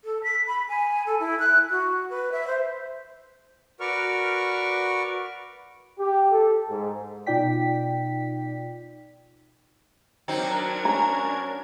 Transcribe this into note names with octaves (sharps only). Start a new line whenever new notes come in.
A4
B6
B5
G#5
A4
E4
F#6
F#4
B4
E5
C5
F#4 A#4 B4 D5 C#6 F6
G4
A4
G#2
B2 D#4 F4 D5 G5 B6
F#3 C4 D4 D#4 A#4 G#6
C#4 A#5